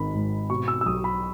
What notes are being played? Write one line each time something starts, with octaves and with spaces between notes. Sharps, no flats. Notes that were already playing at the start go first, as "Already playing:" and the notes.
Already playing: G#1 G#2 D#3 B5
G#2
B2 C#6
E6
E6
B1 D#6
B5